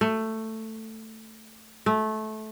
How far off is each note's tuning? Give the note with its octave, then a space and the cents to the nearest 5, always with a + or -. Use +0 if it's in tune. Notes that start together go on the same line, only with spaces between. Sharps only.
A3 +10
A3 -20